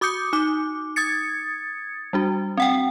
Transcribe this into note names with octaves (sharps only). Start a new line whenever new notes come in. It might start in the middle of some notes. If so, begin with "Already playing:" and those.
F#4 D6 D#6 G6 C#7
D#4 D6
D#6 G#6 A6 C#7
G3 D4 F#4
C4 F#5 G5